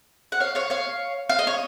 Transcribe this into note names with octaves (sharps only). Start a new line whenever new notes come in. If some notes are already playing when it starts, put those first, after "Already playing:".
F#5
C#5 F5
C#5 F5
C#5 F5
F5
D#5
C#5